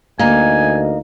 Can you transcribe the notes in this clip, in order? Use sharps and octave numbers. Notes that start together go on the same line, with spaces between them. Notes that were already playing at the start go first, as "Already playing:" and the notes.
D2 A#3 D#4 D#5 G#5